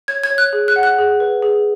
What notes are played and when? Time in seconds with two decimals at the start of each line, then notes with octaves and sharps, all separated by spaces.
0.08 C#5 G#6
0.24 G#6
0.30 C#5
0.38 F#6
0.53 G#4
0.68 F#6
0.76 F#5
0.83 F#6
0.99 G#4
1.20 B4
1.43 G#4